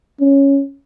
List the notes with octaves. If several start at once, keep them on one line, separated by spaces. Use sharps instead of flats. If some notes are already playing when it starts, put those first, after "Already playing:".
C#4